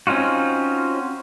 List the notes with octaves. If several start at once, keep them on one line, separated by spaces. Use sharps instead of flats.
C4 C#4 D#4 F4 F#4